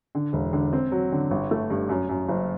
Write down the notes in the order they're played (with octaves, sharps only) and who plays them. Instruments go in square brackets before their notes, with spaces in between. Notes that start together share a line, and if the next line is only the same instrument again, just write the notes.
[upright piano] D3
E1
D3
C4
F#3
D3
G1
A3
G2
F#2
F#2
F#1